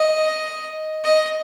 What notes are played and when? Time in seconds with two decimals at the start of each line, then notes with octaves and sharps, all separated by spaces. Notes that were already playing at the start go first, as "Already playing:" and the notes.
Already playing: D#5
1.04 D#5